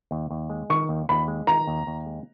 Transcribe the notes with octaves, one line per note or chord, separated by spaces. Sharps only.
D#2
D#2
G#3
D#3 C#6
D#2
D#2 B5
G#3
D#3 A#5
D#2
D#2
G#3